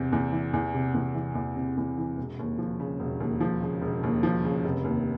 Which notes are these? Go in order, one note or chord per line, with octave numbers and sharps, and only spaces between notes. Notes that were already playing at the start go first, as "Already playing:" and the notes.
Already playing: E2 C3
E2
E3
E2
C3
E2
E3
E2
C3
E2
E3
E1
D#2
F3
C#3
E1
D#2
F3
C#3
E1
D#2
F3
C#3
F1
D#2